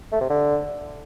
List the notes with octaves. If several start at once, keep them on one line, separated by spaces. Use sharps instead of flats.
A3
C3
D3